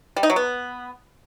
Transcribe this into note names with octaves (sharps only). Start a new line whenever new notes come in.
G3
D#4
F#3
B3